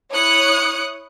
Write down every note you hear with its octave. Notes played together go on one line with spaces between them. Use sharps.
E4 C#5 D#6 F#6 C#7